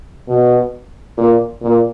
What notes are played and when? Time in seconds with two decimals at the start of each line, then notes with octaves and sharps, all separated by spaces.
0.28 B2
1.18 A#2
1.62 A#2